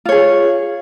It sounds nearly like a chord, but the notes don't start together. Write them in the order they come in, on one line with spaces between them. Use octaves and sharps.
F4 C#5 G#4